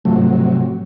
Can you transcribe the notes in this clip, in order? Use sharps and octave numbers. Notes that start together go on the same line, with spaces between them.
G#2 C3 F3 F#3 A3